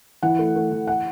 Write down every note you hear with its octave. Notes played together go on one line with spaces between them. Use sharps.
E3 F#5
A3
A3
E3
F#5